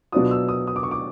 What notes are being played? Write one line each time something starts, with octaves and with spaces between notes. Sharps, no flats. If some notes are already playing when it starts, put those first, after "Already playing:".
B2 F#3 B3 D4 F4 D#6
E6
D#6
D#6
D6
C#6
D6